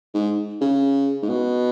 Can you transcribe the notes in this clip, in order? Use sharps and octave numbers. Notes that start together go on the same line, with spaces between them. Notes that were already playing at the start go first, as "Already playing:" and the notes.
G#2
C#3
G#2
B2